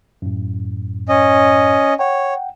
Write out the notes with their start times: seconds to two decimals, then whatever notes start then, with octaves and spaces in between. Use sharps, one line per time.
0.22 F#2 A2
1.09 C#4 D#5
1.99 C#5 F#5 G5